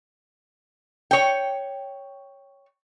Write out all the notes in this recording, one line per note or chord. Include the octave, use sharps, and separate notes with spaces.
C#5 G5